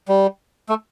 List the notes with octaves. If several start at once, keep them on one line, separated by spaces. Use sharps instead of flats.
G3
A3